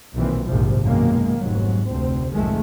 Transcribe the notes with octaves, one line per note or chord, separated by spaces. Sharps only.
B1 A#2 D#3 E3 C4
A#1 D#2 G#2 C3 F3
F#2 B2 D#3 G#3 A#3
F1 G#2 F#3
F1 D2 C4
B1 F2 G#2 D#3 G#3 A3